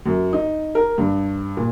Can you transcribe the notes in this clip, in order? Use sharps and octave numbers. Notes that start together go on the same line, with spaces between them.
F#2
D#4
A#4
G2
A#2